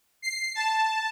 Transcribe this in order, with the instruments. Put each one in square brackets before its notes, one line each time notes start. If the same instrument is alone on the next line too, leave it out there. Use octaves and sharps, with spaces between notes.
[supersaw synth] C7
A5